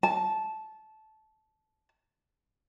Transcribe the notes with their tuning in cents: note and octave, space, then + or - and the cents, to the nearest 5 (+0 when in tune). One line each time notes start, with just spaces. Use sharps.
A5 -15